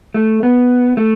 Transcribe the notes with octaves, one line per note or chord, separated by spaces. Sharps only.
A3
B3
A3